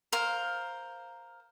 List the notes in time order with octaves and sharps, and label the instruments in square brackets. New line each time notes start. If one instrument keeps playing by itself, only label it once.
[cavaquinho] A#4 C5 F5